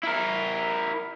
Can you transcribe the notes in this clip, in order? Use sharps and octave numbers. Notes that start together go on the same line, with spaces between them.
E4 A#4